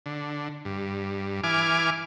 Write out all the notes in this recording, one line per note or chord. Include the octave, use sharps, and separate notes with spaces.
D3
G2
E3 G#5 D6 F6